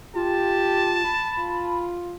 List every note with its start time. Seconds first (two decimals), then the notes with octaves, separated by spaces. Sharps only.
0.15 F4 G4 A5
1.04 B5
1.38 F4